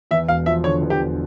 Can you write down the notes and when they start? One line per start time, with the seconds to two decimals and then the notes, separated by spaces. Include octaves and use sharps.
0.11 E2 E5
0.28 E1 F5
0.46 F3 E5
0.64 D3 C#5
0.82 E2
0.90 G4
1.00 E1